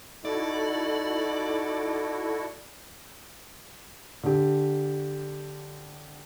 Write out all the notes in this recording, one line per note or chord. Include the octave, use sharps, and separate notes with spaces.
D#4 E4 F#4 A4 D5
D3 G4